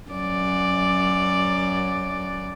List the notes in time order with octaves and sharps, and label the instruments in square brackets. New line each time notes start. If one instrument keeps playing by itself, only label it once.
[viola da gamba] F#2 D5